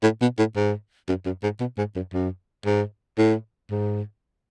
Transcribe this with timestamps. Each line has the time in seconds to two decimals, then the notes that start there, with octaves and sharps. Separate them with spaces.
0.03 A2
0.21 B2
0.38 A2
0.56 G#2
1.09 F#2
1.26 F#2
1.43 G#2
1.60 B2
1.78 G#2
1.96 F#2
2.13 F#2
2.66 G#2
3.18 A2
3.71 G#2